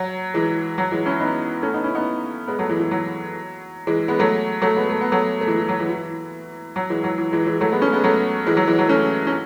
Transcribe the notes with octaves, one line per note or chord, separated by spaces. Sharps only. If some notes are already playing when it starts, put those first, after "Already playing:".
Already playing: F#3
E3 G#3
F#3
E3 G#3
C#4 E4
B3 D#4
A3 C#4
B3 D#4
C#4 E4
B3 D#4
G#3 B3
F#3 A3
E3 G#3
E3
F#3
E3 G#3
G#3 B3
F#3 A3
F#3 A3
G#3 B3
A3
B3
F#3 A3
A3
E3 G#3
E3
F#3
E3 G#3
E3
F#3
E3 G#3
F#3
E3
E3 G#3
E3 G#3
F#3 A3
G#3 B3
A3 C#4
G#3 B3
F#3 A3
E3 G#3
F#3
E3 G#3
F#3
A3 C#4
C#4